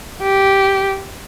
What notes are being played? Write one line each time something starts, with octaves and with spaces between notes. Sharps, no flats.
G4